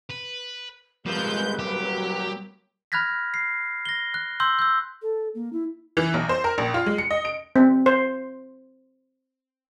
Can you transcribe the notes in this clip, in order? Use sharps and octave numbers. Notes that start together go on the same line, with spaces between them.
B4
F3 G3 G#3 A#3 B3 B4 G6
F#3 G4
B5 F6 F#6 G#6 A#6 B6
C7
A#6 G7
F#6
C6 E6 G6 G7
E6 G6
A4
A#3
E4
E3
B1
C5
A#4
A#1
F4
G#3
C#7
D#5
D7
C4
C5